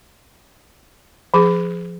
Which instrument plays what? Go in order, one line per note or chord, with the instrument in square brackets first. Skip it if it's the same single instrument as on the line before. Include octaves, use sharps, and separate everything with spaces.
[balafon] F3 G#4